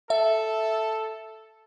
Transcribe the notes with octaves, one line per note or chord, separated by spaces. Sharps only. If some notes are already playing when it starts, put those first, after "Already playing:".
A4 E5